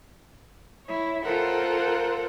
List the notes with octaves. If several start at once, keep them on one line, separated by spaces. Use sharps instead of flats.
E4 C#5
F4 A4 A#4 C5 F#5